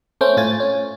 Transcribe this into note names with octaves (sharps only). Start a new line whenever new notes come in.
A3 C4 C#4 G5
A2 F4 G#5 A6
C#4